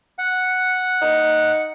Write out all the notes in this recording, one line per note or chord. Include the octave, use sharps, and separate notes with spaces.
F#5
D#4